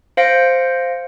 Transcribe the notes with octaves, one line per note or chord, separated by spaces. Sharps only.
C5 F5 A#6 C#7 D7